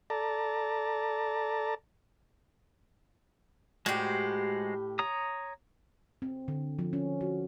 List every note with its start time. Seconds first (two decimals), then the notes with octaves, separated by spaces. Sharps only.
0.10 A4 D5 A5 A#5
3.86 A2 G#3 F#4 G4 C5
4.99 C#5 A#5 D#6
6.22 C4
6.48 D3
6.79 F3
6.93 C#4
7.21 F#4